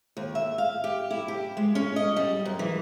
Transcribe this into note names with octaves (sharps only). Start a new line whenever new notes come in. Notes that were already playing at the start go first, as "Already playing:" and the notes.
D#2
E5
F5
G4
E4
G4
G#3
C#4
D#5
G3
F#2
E3